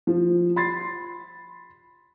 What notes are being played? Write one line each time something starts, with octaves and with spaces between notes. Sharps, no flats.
F3
B5 C6 A6 C7